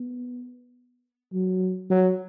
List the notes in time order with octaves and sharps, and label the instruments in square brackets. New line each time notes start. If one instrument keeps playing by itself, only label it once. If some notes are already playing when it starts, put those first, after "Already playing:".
Already playing: [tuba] B3
F#3
F#3